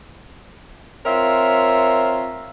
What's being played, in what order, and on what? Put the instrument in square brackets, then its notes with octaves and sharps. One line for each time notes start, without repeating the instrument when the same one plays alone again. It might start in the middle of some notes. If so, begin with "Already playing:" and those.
[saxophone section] C4 F4 A#4 C#5 E5